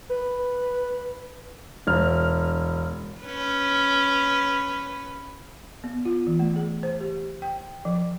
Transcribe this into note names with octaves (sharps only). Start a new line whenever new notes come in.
B4
E1 F6
C#4 B4
B3
F4
E3
A3
G#4
C5
G4
G5
F3